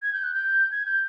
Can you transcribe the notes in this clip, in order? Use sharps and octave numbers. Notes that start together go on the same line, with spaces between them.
G#6
G6
F#6
G6
G#6
G6